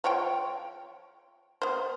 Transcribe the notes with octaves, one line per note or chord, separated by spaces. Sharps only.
F3 C#5 G5
B3 C5